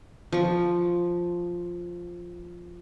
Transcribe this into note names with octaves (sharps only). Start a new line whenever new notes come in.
F3 C#6